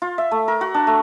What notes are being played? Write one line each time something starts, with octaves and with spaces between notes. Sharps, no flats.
F4
E5
A3
A#4
F#4
D4
A3